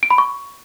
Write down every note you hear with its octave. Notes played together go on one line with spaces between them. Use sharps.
D7
B5
C#6